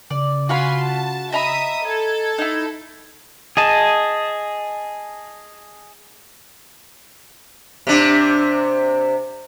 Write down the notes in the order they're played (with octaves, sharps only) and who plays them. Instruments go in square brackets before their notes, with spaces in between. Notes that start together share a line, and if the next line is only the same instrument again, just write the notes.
[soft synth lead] C#3 [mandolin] D5
[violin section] F4 G#5 C6 [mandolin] F#4 F5 B5
[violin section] A5
[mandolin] D#5 A#5 B5 [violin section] E5 D#6
[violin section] A4 [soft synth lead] G#6
[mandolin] D#4 E4
[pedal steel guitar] G#4 D#5 A5
[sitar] C3 D4